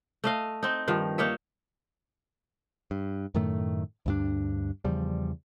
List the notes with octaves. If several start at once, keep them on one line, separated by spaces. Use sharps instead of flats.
A3 D#5 F5
C4 D#4
G2 D#3 F3
A#3 D#4 C#5 E5
G2
F#2 A2 D#3 A3
D2 G2 D4
E2 C#3 F3 G3